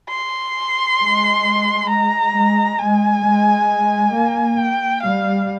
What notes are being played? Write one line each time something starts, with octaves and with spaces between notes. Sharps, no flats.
C6
G#3
A#5
G#3
G#3 G#5
G#3
A#3
G5
G3 F5